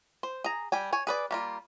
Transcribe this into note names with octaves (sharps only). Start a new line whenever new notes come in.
C5
G#4 A#5
G3 G5 G#5
C#5 G#5
G#4 B4 D5
G3 A#3 F4